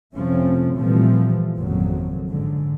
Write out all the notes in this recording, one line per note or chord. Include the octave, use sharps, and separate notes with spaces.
F2 C3 F3 A3 C4 C#4
A#2 E3 F3 G3 A3 C4
G#1 F2 A#2 C#3 F#3
G#2 D3